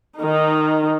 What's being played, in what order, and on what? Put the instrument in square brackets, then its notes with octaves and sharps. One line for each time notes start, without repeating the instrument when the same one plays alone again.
[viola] D#3 D#4